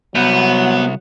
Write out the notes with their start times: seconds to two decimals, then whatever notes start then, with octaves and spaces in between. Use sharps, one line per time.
0.15 C2 F#3 B3